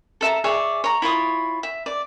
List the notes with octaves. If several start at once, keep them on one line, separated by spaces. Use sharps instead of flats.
A4 E5 A5 A#5
G#4 C#5 D5 E5
C#5 A#5
E4 F4 C#5 D#6
E5
D5